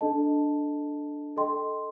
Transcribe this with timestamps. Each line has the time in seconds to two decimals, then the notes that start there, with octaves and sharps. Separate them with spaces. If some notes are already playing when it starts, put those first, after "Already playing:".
0.01 D4 A4 D#5 A5
1.36 A4 D#5 G5 C6